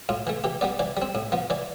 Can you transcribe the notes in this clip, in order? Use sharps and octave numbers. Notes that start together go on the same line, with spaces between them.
A2 F4
E3 A3
E3 G4
G3 B3 D5
E3 D5
G3 C4
A2
F3 B3
E3 D5